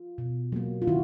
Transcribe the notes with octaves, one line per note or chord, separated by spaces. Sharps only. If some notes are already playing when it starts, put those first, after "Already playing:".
Already playing: F4
B2
F#3 A#3
F4
D#3 E4 F#4